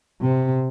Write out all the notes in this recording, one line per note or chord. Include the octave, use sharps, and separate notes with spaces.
C3